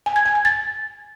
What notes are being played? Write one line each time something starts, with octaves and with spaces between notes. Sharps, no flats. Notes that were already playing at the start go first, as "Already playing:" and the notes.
G#5
G#6
G#5
G#6
A6